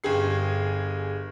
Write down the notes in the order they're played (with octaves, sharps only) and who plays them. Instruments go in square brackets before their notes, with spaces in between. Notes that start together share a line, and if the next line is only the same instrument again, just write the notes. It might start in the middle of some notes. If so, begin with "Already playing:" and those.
[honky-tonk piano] G1 G4 G#4 C7